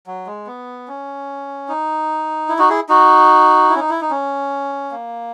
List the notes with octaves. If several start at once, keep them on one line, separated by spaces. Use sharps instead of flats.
F#3
G#3
B3
C#4
D#4
E4
D#4 F#4
E4 G#4
D#4 F#4
E4
C#4
D#4
E4
D#4
C#4
A#3